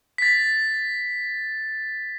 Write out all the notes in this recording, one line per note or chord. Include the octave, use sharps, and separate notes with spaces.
A6 B6